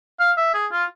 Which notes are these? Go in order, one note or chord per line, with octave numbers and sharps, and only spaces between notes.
F5
E5
G#4
F4